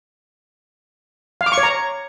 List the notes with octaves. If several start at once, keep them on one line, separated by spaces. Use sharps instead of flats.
F5
D6
C#6
C#5
A#5